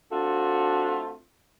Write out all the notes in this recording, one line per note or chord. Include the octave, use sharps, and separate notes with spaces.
A3 C4 D4 F4 F#4 A4